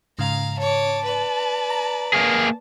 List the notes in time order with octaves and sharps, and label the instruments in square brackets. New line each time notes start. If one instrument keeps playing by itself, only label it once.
[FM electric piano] G#2 C#3 [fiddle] F5 A#5
[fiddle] C#5 D6 [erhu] A5
[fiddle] B4 D5
[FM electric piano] A#5
[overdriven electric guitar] A#3 G#4